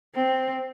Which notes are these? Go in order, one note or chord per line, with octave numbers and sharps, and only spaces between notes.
C4